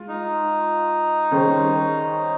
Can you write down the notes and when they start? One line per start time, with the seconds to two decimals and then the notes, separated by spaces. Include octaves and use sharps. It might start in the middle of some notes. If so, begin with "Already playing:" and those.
Already playing: G#3 F4
0.08 D#4
1.31 D#3 G3 C#4 G#4 C5